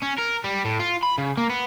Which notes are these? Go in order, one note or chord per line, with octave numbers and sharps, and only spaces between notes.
C#4
A#4
G3
A2
F4
B5
C#3
A#3
B3